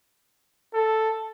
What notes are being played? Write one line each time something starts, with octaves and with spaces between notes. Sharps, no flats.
A4